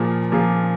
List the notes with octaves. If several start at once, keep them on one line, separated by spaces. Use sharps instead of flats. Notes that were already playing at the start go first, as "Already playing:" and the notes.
Already playing: A#2 F3 A#3 F4 G#4
A#2 F3 A#3 F4 G#4